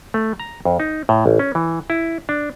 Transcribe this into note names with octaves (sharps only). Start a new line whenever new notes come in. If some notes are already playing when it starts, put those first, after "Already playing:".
A3
A#5
F2
D#4
A2
A1
C#4
E3
E4
D4